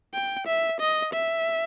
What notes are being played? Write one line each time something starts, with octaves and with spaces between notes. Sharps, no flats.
G5
E5
D#5
E5